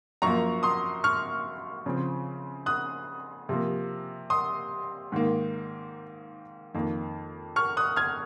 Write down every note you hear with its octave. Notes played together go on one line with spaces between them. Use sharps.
F#2 F3 A#3 A#5 C#6
C6 D#6
C#6 F6
C#3 F3 C4
D#6 F#6
C3 F3 A#3
C6 D#6
G#2 D#3 A#3
F2 D#3 A#3
C#6 F6
D#6 F#6
F6 G#6